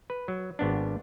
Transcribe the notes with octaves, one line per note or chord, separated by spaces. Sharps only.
B4
F#3
G#1 B3 D4